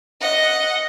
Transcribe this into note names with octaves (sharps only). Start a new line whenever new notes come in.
D#5 F#5